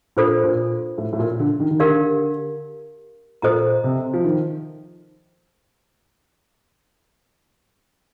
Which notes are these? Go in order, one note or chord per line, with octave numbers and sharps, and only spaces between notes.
A#2 D4 F4 A4 C5
A#2
A2
A2
A#2
D3
D#3
D#3
D3 G4 A#4 D5 F5
A#2 A4 C5 D#5 A#5
C3
F3
D#3